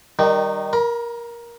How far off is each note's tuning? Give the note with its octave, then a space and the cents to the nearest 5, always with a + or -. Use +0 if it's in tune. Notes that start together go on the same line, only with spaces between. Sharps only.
D#3 +0 G3 +0 D#4 -25
A#4 +15 B5 -35